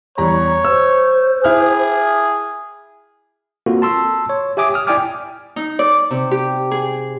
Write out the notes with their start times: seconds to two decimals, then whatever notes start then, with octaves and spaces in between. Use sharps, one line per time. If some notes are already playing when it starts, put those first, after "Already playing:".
0.18 E2 G3 C#5 A#5
0.65 C5 E6
1.44 E4 G#4 F6
3.66 A#3 C4 F4 F#4 A4
3.82 A5 C6 E6
4.29 C#5
4.57 G4 E5 G#5 D6 D#6
4.74 D#6 F6
4.87 E4 D5 G5 G#5 D6 F6
5.56 D#4
5.79 D5
6.11 C3
6.31 G4
6.71 G#4